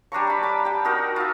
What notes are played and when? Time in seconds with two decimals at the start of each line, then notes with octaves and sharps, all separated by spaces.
0.12 G3 D4 A#5 C#6
0.27 A5 B5
0.43 B5 D6
0.65 G4 G5
0.85 D#4 F#4 A#4 G5
1.16 F4 E5